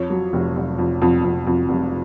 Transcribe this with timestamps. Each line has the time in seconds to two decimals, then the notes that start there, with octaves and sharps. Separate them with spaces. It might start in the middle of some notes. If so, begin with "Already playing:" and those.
Already playing: F2 C#5
0.10 F#3
0.33 F1
0.56 F1
0.78 F2
1.02 F2
1.24 F2
1.47 F2
1.69 F1